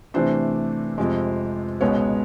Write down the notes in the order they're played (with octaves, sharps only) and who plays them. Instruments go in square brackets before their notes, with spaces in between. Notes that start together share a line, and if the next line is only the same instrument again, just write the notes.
[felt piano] C3 E3 A3 D4 C5
F2 C3 F3 G#3
C#2 B2 G#3 B3 C#5